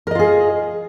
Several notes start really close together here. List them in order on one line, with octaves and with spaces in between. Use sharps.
A#4 D#5 F4 G#4